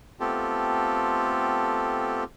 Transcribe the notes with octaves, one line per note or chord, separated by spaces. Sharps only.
A3 B3 C4 F4 G4 A4